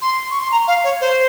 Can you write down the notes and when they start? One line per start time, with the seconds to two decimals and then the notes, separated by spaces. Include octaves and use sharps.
0.01 C6
0.30 C#6
0.41 C6
0.51 A#5
0.67 F5
0.84 C#5
1.00 C5